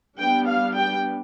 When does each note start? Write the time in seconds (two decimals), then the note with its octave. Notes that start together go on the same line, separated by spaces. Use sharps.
0.19 G3 B3 D4 G5
0.47 F5
0.76 G5